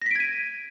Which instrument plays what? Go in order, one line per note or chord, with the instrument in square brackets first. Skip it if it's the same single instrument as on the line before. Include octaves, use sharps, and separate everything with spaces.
[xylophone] A#6
B6
D7
G#6
D#7